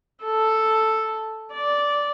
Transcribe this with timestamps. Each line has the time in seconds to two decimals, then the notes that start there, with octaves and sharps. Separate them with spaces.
0.24 A4
1.54 D5